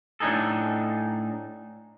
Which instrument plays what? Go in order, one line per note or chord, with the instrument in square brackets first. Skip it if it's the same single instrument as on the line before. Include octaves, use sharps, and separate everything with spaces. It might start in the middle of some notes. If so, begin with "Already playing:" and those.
[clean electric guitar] A2 D4 D#4 G#4 A4